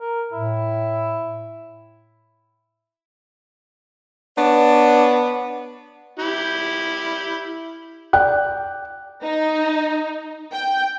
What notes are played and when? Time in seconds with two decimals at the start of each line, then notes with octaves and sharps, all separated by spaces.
0.01 A#4
0.33 A2 E4
4.38 B3 D4 C#5 D5
6.19 E4 G4
8.13 D5 G5 F#6
9.23 D#4
10.53 G5